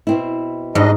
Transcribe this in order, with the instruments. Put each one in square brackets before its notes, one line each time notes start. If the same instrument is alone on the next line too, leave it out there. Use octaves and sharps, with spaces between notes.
[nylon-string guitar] B2 C4 E4
[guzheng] G#2 [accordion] G3 D4 D#5